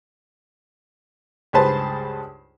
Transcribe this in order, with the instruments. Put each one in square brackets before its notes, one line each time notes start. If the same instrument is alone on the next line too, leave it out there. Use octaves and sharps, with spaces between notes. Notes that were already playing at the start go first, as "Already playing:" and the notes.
[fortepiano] C#2 G2 G#4 B4 C5 A5